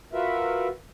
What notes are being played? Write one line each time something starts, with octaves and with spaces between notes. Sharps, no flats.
F4 F#4 A#4 B4 E5